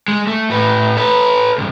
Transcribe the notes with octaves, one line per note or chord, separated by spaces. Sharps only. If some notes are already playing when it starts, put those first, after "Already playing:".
G#3
A3
A2 B4
A4 B4
C#2 G2